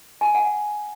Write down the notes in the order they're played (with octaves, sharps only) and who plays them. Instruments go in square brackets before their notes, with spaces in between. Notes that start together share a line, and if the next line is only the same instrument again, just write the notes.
[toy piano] G#5
F#5